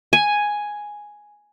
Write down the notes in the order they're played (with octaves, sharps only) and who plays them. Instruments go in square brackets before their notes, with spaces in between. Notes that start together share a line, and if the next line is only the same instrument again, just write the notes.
[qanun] G#5